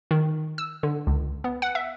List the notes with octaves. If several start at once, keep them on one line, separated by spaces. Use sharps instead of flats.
D#3
E6
D3
C#2
B3
F#5
E5